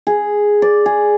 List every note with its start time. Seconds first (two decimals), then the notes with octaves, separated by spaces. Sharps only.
0.07 G#4
0.62 D5
0.86 G#4